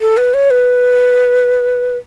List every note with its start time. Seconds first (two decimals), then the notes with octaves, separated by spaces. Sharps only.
0.01 A4
0.17 B4
0.34 C#5
0.51 B4